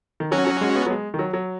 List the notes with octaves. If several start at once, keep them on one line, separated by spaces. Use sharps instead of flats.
D#3
F#3 C#4 F#4
F#3
G#3
B3
F#3
G#3
D#3
F#3
F#3